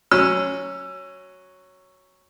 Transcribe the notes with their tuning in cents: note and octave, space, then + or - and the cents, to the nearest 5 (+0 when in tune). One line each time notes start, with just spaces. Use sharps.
F#3 +0 C#4 +0 E6 +25